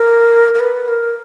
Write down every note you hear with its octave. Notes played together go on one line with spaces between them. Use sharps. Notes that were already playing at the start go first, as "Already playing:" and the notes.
Already playing: A#4
A#4
B4
A#4